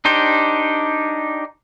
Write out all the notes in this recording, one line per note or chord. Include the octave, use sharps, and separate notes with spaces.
D4 D#4 G4 C5